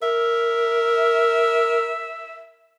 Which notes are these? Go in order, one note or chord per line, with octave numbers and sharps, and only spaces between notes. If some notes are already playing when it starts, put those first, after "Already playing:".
A#4 E5